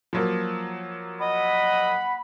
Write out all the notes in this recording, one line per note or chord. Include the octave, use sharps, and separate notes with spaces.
F3 F#3 A#3
D#5 F#5 B5